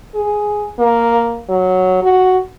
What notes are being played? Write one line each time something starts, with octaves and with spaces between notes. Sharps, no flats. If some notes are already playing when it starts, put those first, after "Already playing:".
G#4
A#3
F#3
F#4